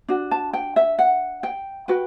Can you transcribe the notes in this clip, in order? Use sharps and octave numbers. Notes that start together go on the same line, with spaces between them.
D4 F#4
A5
G5
E5
F#5
G5
F#4 B4 G5